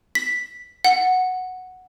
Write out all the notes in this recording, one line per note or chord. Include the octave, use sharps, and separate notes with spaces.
B6
F#5